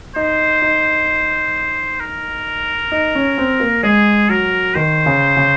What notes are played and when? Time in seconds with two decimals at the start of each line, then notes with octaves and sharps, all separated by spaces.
0.16 D#4 C5
0.62 D#4
2.00 A#4
2.92 D#4
3.15 C#4
3.38 C4
3.60 A#3
3.83 G#3 G#4
4.29 F#3 A#4
4.75 D#3 C5
5.06 C#3
5.37 C#3